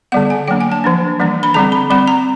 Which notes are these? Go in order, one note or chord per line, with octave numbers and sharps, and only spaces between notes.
D3 G3 B3 F#5
G#5
F#3 A#3 D4 G5
G#5
A5
F3 A#3 D4
E3 G3 A#3 D4
B5
D3 G3 C4 A#5
B5
G3 C4 B5
A#5